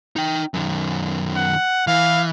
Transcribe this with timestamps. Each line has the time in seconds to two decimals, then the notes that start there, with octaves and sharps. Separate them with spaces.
0.16 D#4 G5
0.54 F#2 D#3
1.36 F#5
1.87 E3 F5